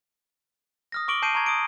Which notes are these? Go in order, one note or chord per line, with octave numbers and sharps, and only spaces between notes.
D#6 F6 A#6
C#6 D6 D7 F#7 G7
A5 G6 C7 D7 D#7
A#5 C#6 G#6
D#6 D7